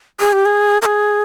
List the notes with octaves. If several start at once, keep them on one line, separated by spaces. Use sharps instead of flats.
G#4
G4
G#4
A#4
G#4